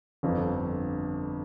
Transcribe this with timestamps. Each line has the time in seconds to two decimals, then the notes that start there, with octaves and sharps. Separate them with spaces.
0.23 G1 F2 D3